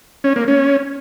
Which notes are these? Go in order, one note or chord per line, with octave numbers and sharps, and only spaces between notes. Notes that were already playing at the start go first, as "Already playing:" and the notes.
C#4
A#3
C#4